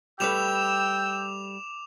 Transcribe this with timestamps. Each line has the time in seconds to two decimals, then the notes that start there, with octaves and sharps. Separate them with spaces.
0.20 G3 A3 B4 G5 D6 E6 E7 F7